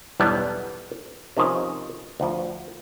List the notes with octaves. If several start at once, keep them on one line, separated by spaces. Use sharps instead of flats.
B1 E2 G2 E3 G3 B3
C3 D#3 F3 C#4
D2 F3